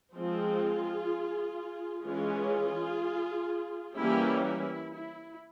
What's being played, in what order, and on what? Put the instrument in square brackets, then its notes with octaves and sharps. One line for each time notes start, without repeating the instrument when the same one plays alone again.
[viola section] F3 G#3 C4 F4 G#4
E3 G#3 C#4 F4 G#4
E3 G3 A#3 C#4 E4 G4
E4
E4